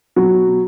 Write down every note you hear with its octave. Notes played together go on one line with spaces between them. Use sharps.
B2 F#3 F#4
B2
B2